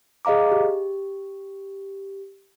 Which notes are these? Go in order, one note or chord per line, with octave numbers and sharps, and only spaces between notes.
G#4 D#5 F5 A#5 D6
G4